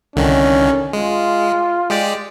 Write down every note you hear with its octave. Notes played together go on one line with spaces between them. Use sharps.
C2 D3 D#3 C#4
G#3 F4
G#3 G4 D5